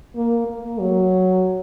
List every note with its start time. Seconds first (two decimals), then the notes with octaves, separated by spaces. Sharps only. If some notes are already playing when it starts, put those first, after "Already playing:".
0.16 A#3
0.48 A#3
0.80 F#3